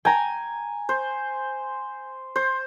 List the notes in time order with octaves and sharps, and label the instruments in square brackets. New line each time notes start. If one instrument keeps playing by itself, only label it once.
[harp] G5 A#5 [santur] G#5
[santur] C5
C5